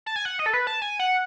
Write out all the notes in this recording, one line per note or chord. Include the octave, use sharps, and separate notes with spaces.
A5
G#5
F#5
D#5
A4
B4
A5
G#5
F#5